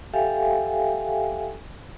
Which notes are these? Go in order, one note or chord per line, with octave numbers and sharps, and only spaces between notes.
G4 A4 E5 F5 G5 G#5